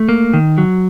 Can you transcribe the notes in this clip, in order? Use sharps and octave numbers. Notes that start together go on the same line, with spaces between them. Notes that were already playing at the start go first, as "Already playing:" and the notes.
Already playing: A3
A#3
D#3
F#3